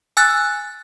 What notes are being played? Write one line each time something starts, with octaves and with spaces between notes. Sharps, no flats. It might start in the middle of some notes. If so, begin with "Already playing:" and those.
G#5 E6 F#6 A6